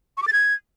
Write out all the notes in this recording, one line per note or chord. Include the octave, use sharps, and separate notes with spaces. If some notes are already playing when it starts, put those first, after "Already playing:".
C#6
D6
A6
G#6